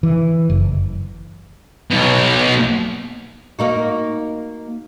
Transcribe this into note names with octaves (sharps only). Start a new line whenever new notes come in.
E3
F#1
B1 B2
A#3 D#4 F#4